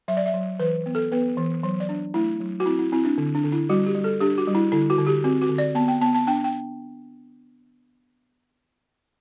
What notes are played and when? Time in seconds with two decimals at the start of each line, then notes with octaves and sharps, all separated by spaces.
0.08 F#3 E5
0.17 D5
0.26 E5
0.34 F#3
0.59 E3 B4
0.86 B3
0.95 A4
1.12 B3 B4
1.37 E3
1.63 F#3 C5
1.80 D5
1.89 D4
2.14 A3 E4
2.41 F#3
2.60 F#4
2.66 C4 E4
2.79 E4
2.92 C4 E4
3.05 D4
3.18 D3
3.35 D4
3.44 D3
3.52 E4
3.69 G3 F#4
3.86 G4
3.95 G3
4.04 A4
4.20 D4 G4
4.38 F#4
4.47 G3
4.55 E4
4.72 D3 E4
4.90 F#4
4.98 D3
5.07 G4
5.24 C4 F#4
5.42 F#4
5.49 D3
5.58 D5
5.75 B3 A5
5.88 G5
6.01 B3 A5
6.15 A5
6.27 D4 G5
6.44 G5